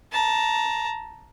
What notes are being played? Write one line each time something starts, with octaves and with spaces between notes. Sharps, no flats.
A5 A#5